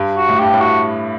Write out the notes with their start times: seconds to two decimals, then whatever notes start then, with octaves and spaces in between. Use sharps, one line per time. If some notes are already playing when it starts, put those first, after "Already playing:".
Already playing: G2
0.16 F#4
0.29 A2
0.39 G2 G4
0.54 A2
0.61 F#4